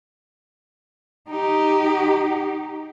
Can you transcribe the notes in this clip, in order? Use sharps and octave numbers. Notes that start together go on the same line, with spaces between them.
D#4 G4